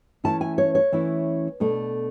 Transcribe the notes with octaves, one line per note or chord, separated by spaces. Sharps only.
E3 A3 C#4 E4 A5
G#5
C#5
C#5
E3 A3 C#4 E4
B2 A3 D4